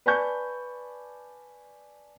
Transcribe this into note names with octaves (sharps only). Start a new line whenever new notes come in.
B4 D5 G#5 A5 C#6 G6